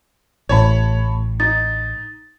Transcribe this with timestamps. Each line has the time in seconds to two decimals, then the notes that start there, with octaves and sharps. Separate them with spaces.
0.49 A1 A2 C#5 A5 B5
1.40 D#4 A6